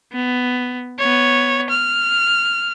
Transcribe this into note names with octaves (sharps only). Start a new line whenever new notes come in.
B3
B3 C#5
F6